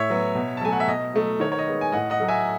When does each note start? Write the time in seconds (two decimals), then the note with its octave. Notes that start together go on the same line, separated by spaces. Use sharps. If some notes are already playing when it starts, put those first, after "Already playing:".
Already playing: A2 C#5 E5
0.10 F#3 B3
0.35 B2
0.57 A5
0.61 F#3 A3 G#5
0.73 F#5
0.80 E5
0.87 B2 D#5
1.14 F#3 A3
1.40 D#3 C#5
1.52 C#5
1.59 D#5
1.67 G#3 B3
1.81 G#5
1.92 A2 D#5 F#5
2.10 D#5 F#5
2.20 F#3 A3
2.28 E5 G#5